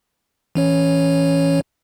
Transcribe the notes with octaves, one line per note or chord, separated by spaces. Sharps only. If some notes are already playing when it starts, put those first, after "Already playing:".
E3 C#4 C#5